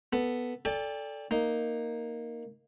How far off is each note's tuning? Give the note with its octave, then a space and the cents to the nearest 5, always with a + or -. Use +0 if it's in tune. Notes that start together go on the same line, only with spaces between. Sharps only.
B3 +0 A4 +0
A4 +0 D5 -15 G5 +35
A#3 +0 D#4 +0